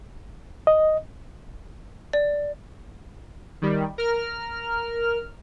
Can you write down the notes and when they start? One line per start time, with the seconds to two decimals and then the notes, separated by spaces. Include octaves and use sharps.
0.67 D#5
2.13 D5
3.62 D#3 G3
3.98 A#4 F6